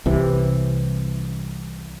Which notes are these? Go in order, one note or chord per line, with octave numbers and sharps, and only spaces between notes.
C2 C3 E3